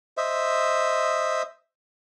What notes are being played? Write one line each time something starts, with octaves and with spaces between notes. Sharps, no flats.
C5 D#5 E5